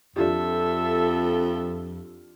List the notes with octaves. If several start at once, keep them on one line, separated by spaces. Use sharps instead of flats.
F2 D4 F4 G4 A4 E5